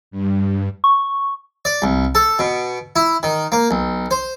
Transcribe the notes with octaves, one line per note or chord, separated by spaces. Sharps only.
G2
C#6
D5
C2
A4
B2
E4
D#3
A#3
B1
C5